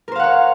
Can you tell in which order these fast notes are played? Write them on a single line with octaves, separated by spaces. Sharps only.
A#4 C5 F5 F#5 C#5